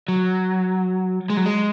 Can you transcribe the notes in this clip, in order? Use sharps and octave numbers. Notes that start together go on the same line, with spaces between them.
F#3
G#3
F#3
G#3